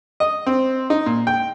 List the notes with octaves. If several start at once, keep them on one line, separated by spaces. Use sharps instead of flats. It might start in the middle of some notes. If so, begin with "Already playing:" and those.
D#5
C4
D#4
A#2
G5